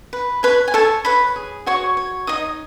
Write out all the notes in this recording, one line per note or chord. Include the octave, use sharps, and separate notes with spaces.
B4
B4 C#5 B5
G#5
A4 C#5 A5
B4 C#5 B5
G#4
F#4 C#5 C#6
C#5
D#4 D#5 D#6